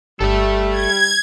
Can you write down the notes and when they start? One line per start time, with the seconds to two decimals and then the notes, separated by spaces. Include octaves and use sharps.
0.21 G1 G3 A4 E5
0.71 G#6